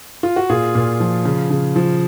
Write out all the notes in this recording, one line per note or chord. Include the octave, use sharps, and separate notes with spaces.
F4
F#4
A#2 F4 G#4
A#2
F3
C#3
C#3
F3